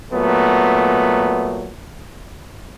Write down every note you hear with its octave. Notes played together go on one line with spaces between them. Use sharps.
A#2 F#3 A3 B3